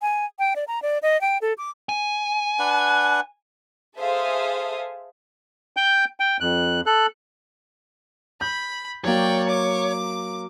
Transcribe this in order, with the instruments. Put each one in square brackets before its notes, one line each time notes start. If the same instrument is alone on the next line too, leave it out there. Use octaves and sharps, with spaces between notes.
[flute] G#5
G5
D5
A#5
D5
D#5
G5
A4
D6
[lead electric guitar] G#5
[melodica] D4 B4 F#5
[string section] G#4 A4 C5 E5 F5 D#6
[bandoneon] G5 G6
G5
F2 F#6
A4 F#6
[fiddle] B5 [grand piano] G6
[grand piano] F#3 A#3 [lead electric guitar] C#5 [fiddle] D5 G5
[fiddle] D6